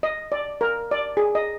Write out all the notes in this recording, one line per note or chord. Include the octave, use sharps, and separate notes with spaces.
D#5
D5
A#4
D5
G#4
D#5